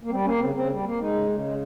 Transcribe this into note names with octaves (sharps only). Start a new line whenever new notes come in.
A#3
G3 C4
A#3 C#4
C#3 C4
C#3 C4
G3
A#3
G#3 D#4
C#3
C#3
G#3